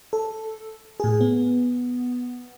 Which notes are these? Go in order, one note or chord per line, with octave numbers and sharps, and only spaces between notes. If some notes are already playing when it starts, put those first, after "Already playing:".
A4
A2 G#4
B3